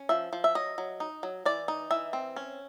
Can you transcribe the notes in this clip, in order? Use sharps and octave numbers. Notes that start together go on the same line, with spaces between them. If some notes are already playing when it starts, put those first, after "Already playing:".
Already playing: C#4
F3 E5
F3
E5
F#3 D#5
F#3
D#4
F#3
E3 D5
D#4
E3 E5
C4
C#4